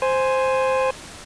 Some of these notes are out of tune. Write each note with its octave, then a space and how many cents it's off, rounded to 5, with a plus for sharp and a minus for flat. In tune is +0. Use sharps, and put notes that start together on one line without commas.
C5 +0 G#5 +0